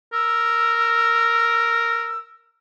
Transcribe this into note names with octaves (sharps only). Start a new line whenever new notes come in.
A#4 E6